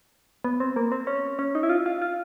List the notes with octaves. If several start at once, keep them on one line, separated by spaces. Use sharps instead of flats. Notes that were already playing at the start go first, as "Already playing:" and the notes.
B3
C4
A#3
C4
C#4
C#4
D#4
E4
F4
F4
F4